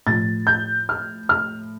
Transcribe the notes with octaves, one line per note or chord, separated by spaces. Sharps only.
A2 F3 A6
G6
F6
F6